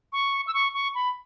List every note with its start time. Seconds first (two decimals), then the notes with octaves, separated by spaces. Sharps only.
0.13 C#6
0.47 E6
0.54 C#6
0.74 C#6
0.95 B5